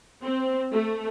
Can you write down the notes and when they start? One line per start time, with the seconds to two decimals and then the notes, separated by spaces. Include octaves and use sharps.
0.23 C4
0.72 A3